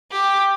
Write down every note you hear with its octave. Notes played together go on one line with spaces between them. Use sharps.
G4